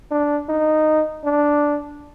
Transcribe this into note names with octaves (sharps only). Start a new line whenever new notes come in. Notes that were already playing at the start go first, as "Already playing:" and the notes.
D4
D#4
D4